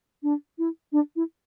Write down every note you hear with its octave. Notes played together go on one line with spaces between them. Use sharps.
D4
E4
D4
E4